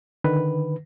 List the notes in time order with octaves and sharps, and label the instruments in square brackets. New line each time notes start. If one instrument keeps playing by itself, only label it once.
[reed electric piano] D3 D#3 B4